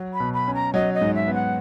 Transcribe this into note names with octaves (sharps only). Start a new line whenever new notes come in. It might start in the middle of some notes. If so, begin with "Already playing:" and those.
Already playing: F#3
B5
B2
B5
C#4
A#5
F#3 D#5
D#5
G#2
E5
B3
F#5